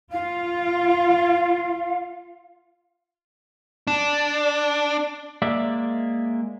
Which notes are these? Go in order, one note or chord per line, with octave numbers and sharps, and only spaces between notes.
F4 F5
D4
G#3 A#3 D5 E5